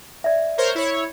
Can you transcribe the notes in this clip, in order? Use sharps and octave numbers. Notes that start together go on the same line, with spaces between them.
D5 E5
A#4 C5 C#5
E4 C#5